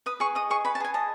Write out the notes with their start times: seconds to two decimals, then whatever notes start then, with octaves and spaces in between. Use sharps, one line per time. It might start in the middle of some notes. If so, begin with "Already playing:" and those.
0.06 B4 D#6
0.20 G#4 C#6
0.35 D#5 D#6
0.50 G#4 C#6
0.65 B4 B5
0.75 A5
0.80 G#4 G#5
0.94 D#5 A5